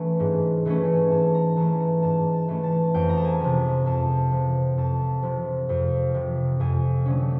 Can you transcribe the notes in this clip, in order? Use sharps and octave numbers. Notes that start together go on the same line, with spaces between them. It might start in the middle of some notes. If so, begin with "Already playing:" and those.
Already playing: E3 A3 C#4
G#2
E3 A3 C#4
G#2 A5
A#5
E3 A3 C#4 A5
A#5
G#2 A5
A5
E3 A3 C#4
A5
F2 G5
A#5
A5
G#5
C3 F3
F2 A5
C3 F3
F2 A5
C3 F3
F2
C3 F3
F2 G#5
D3 F#3 A3 C#4